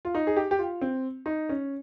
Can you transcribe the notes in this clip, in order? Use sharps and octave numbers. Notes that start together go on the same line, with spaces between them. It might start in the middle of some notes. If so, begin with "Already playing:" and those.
F4
D#4
G#4
G4
G4
F4
C4
D#4
C#4